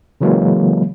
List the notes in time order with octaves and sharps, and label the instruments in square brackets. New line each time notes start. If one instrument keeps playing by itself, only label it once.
[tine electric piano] C#3 E3 F#3 G#3 A#3